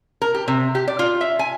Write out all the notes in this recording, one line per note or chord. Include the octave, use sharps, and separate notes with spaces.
A#4
G4
C3
G4
D5
F4
E5
G#5